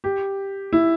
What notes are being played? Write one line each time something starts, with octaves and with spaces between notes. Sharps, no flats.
G4
E4